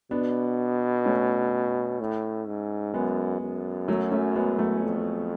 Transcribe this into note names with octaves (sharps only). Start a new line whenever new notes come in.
B2 B3 D4
A3 C#4
A2
G#2
F#2 G#3 B3
F#2
F#3 A3
A3 C#4
G#3 B3
F#3 A3
F2